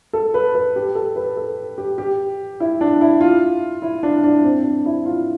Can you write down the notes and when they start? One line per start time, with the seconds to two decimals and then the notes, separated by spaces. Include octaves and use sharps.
0.13 A4
0.34 B4
0.55 B4
0.76 G4
0.95 A4
1.16 B4
1.37 A4
1.78 G4
1.98 G4
2.60 E4
2.81 D4
3.01 E4
3.21 F4
3.82 E4
4.03 D4
4.24 D4
4.44 C4
4.64 D4
4.86 E4
5.06 F4